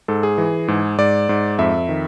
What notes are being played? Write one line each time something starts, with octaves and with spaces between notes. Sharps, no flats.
G#2 A4
G#4
E3
G#2
G#2 D5
G#2
F2 E5
D#3